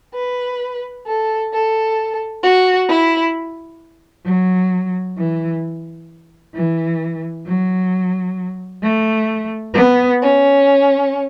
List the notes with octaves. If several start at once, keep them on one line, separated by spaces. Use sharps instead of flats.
B4
A4
A4
F#4
E4
F#3
E3
E3
F#3
A3
B3
C#4